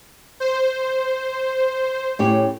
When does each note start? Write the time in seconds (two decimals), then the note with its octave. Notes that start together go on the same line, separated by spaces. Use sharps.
0.40 C5
2.19 A2 C#4 G4